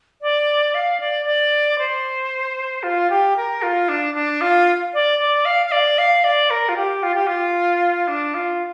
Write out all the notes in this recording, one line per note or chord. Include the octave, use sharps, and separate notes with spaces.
D5
F5
D5
D5
C5
F4
G4
A#4
F4
D4
D4
F4
D5
D5
F5
F5
D5
F5
D5
A#4
F4
G4
F4
G4
F4
D4
F4